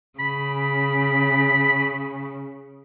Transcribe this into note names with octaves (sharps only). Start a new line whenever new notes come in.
C#3 B5